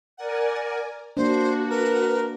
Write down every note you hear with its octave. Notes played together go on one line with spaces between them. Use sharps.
A#4 D5 F#5 G#5
A#3 D4 F#4 C5
A#4 B4